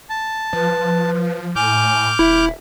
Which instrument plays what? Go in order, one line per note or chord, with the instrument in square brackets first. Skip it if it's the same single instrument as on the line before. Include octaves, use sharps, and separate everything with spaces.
[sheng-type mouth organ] A5
[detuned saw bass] F3 [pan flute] B4
[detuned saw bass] A2 [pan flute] G#5 [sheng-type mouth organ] D6 F6 G6
[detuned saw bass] D#1 [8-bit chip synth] E4 [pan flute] E5